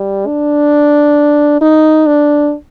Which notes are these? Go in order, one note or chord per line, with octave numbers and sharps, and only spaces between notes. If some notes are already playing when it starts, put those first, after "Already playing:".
Already playing: G3
D4
D#4
D4